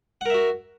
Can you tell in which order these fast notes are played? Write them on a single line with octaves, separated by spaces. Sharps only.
F#5 A#4 E5 F#4